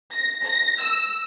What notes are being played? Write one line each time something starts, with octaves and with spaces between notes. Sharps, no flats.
A#6
A#6
E6